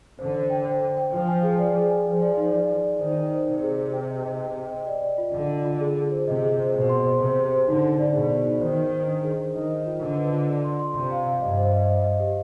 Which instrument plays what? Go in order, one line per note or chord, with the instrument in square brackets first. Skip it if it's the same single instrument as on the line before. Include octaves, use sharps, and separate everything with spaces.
[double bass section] D3 [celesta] C5
[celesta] C5
G5
C5
C5
G5
[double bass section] F3 [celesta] F4
[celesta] G#5
G#4
D5
G#4
G#5
[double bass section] F3 [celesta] G#4
[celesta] D5
D#4
D5
D5
D5
[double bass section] D#3 [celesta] C5
[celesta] D#4
C5
[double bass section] C3 [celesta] D#4
[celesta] G#4
G#4
G5
D#5
D#5
G5
G5
D#5
D5
D5
F4
[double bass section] D3 [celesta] F4
[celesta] F4
F4
G#4
G#4
C5
[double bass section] C3 [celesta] D#5
[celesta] G#4
C5
[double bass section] B2 [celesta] C5
[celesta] C6
C5
[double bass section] C3 [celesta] C5
[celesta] C5
C5
[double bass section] D3 [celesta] D#4
[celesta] D#4
D5
[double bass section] B2 [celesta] G#4
[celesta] D5
D#4
[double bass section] D#3 [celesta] C5
[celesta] C5
C5
D4
G#4
C5
[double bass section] D#3 [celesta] D#5
[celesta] D#5
F4
[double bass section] D3 [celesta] D#5
[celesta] B4
F4
D5
C6
C6
[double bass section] C3 [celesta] C6
[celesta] F5
F5
[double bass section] G2 [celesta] D#5
[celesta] C5
D#5
D#5
D#5
G4